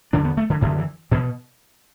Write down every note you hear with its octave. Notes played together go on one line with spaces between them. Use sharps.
E2 D3 D4
B3
A3
D3
F#2 D3 E3
E3
B2 E3